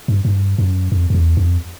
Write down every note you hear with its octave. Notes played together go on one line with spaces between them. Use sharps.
G2
G2
F#2
F2
F2
E2
F2